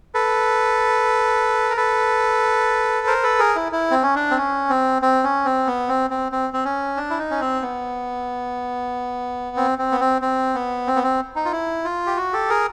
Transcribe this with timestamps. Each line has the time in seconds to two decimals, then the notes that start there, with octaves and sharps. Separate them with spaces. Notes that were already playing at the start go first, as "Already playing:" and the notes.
0.14 A4 B4
1.70 A#4
1.77 A4 B4
3.07 A#4 C5
3.23 A4 B4
3.39 G#4 A#4
3.56 E4
3.72 E4
3.91 C4
4.03 C#4
4.16 D4
4.31 C4
4.37 C#4
4.69 C4
5.02 C4
5.24 C#4
5.45 C4
5.67 B3
5.89 C4
6.10 C4
6.32 C4
6.53 C4
6.65 C#4
6.97 D4
7.10 E4
7.19 D#4
7.31 C#4
7.41 C4
7.62 B3
9.57 C4
9.79 C4
9.91 B3
10.00 C4
10.22 C4
10.55 B3
10.87 C4
10.96 B3
11.03 C4
11.36 D#4
11.45 F4
11.52 E4
11.85 F4
12.07 G4
12.17 F#4
12.33 G4 A4
12.49 G#4 A#4